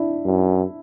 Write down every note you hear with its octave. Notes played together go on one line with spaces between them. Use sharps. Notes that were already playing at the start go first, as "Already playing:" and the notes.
Already playing: D4 E4
F#2